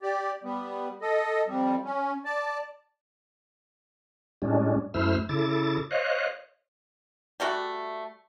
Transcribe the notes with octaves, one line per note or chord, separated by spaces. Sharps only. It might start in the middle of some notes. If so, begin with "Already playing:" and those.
G4 D5
G3 B3
A4 D#5
F2 G3
C#4
D5 A5
A2 G3 G#3 C#4 D4
F#2 A3 E4 C5 E6 F6
C#3 E4 A4 D6 A6
C5 C#5 D#5 F5 F#6
G3 A3 F#4 F#5